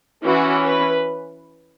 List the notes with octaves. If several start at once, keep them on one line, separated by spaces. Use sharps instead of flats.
E3 C#4 F#4
B4